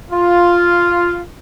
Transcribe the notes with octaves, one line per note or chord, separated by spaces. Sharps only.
F4